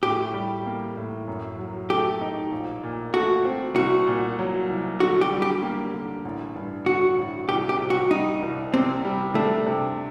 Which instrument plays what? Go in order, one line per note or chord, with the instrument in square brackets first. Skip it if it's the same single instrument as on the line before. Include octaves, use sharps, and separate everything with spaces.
[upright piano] A2 [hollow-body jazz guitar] G4
[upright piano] G3
A#3
A2
F#2
F#3
[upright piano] A3 [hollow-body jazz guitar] G4
[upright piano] D#4
A#1
A#2
[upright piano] A3 [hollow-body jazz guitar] F#4
[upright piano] C4
[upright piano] C2 [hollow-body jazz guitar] F#4
[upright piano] A#2
F#3
C2
[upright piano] D3 [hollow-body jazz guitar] F#4
[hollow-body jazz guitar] G4
[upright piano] G3
[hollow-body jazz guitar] G4
[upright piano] A#3
D3
A1
G2
[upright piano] D3 [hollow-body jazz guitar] F#4
[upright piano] A1
[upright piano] C2 [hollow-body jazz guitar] G4
[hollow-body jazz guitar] G4
[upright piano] C3
[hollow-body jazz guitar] F#4
[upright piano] G3 [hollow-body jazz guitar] D#4
[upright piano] C2
[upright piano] C3 [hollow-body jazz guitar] C4
[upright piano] G3
[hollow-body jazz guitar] A3 [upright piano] D4
[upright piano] C3